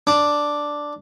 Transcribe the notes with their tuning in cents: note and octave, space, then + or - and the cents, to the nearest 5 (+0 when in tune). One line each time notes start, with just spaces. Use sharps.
D4 +0